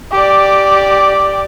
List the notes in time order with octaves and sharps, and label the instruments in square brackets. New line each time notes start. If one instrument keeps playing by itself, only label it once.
[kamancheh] G4 D5